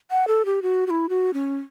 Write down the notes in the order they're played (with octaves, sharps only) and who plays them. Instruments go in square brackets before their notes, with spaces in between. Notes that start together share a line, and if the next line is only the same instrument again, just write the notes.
[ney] F#5
A4
G4
F#4
F#4
E4
F#4
C#4